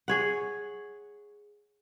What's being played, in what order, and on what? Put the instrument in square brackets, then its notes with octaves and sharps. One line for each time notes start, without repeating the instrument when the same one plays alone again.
[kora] G#4 C#5 F#5